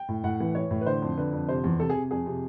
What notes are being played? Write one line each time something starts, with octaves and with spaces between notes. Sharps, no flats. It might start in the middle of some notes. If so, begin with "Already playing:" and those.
Already playing: G5
A2
A2 F#5
E3
E3 C#5
A2
B4
D3 C5
F2
D3 B4
F2
C3 C5
E2
C3 A4
G#4
C3
F2 G#4
C3